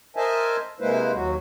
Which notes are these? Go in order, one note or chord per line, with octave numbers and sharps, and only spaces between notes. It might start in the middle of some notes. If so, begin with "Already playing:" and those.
A#4 C5 D#5 E5 G#5 A5
C3 G#3 A#3 E4 B4 C5
D#2 F#3 F#4